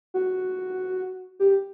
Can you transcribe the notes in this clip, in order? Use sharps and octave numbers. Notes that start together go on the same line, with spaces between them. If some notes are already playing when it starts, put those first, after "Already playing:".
F#4
G4